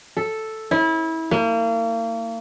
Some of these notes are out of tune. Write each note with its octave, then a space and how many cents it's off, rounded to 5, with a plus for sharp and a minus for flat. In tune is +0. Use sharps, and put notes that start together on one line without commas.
A4 +0
E4 -25
A#3 -35